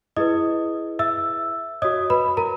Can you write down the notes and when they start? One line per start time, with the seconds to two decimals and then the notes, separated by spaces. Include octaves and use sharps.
0.16 E4 G#4 B4 D#5 D#6
0.99 E5 E6
1.82 F#4 C#5 D#5 D#6
2.10 B4 B5
2.37 A#4 A#5